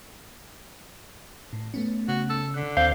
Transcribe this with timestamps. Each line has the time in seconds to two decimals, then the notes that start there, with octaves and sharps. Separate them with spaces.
1.53 A2
1.74 A3 B3 C#4
2.08 C#3 F#4
2.30 A4
2.54 D3 F#6 B6
2.77 D#2 C4 C5 F5 G6